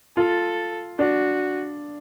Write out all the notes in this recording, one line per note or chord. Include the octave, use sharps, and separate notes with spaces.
F4 A4
D4 F#4